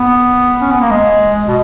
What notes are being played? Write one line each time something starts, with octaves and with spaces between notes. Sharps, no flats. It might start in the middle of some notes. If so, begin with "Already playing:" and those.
Already playing: B3
C#4
B3
A#3
G#3
B2